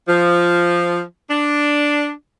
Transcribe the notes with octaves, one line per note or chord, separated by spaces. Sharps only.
F3
D4